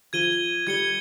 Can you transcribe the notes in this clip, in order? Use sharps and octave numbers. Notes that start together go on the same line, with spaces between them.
F3 G#6 D#7 G7
G3 G#6 C#7 G7